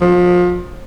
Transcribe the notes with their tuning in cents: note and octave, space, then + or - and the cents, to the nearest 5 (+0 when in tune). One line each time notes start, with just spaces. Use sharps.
F3 +30